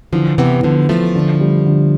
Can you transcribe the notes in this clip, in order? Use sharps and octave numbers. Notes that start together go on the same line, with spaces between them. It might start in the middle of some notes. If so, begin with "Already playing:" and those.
D3 E3 F3
C3 E3 B3
D3 F3 B3
E3 F3 A3
D3
G3
D3